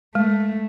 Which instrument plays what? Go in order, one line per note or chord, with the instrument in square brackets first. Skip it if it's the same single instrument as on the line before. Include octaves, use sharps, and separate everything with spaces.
[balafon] G#3 [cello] A3